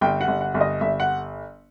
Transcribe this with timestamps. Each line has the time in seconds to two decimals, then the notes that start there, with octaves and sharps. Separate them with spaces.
0.01 G1 G5
0.21 F#5
0.28 G1
0.41 F#5
0.54 G1
0.61 D#5
0.81 G1 E5
1.00 F#5